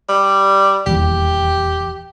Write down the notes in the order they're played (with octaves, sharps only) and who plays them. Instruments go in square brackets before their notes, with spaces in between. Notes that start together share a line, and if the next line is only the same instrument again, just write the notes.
[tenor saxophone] G3
[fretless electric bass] D#1 E2 [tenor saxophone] G4